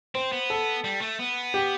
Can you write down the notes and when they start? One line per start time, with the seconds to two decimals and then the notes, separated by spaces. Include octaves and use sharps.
0.15 C4 C5
0.32 B3
0.50 A4
0.84 G3
1.01 A3
1.19 B3
1.54 G4